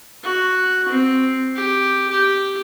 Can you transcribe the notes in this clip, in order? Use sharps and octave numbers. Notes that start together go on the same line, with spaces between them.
F#4
C4
G4
G4